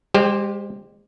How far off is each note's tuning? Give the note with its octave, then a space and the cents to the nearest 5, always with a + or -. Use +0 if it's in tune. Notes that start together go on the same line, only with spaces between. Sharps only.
G#3 -40 G4 +0 C5 +0